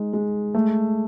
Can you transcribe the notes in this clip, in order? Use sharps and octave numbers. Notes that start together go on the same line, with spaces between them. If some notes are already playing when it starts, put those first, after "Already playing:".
Already playing: G#3 D#4
G#3
A3